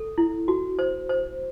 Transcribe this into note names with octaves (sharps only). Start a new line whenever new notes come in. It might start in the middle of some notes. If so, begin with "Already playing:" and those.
Already playing: A4
E4
F#4
C5
C5